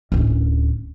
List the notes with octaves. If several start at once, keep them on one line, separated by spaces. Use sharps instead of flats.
D1 C#4